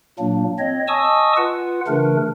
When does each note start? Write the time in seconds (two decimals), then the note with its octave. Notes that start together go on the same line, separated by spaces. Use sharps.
0.19 A#2 F#3 A#3 D4
0.59 C4 C#5 D#5
0.88 D#5 G#5 A5 C#6 D#6 E6
1.37 F4 B4 F#5
1.88 C#3 E3 A3 D4 A#4 B4